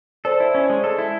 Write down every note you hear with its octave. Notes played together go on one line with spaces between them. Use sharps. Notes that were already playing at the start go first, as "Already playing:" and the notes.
A4 C5 D5
E4
C#4
G#3
A4
E4